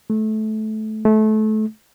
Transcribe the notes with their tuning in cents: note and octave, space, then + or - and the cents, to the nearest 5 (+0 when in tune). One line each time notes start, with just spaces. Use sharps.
A3 -20
A3 -25